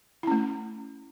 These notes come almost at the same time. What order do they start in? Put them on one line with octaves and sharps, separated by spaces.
E4 C#4 A3